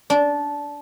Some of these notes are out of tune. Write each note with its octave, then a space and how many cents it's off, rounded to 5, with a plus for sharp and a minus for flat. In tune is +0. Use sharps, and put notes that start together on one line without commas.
D4 -15